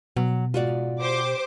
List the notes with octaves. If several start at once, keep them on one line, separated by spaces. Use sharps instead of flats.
B2 F#3
G#2 F4 F#4 D5
G4 C5 D6